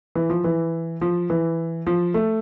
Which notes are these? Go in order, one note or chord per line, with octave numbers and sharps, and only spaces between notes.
E3
F3
E3
F3
E3
F3
A3